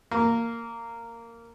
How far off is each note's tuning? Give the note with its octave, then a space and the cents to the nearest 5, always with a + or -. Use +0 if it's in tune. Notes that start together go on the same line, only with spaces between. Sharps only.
A#3 -10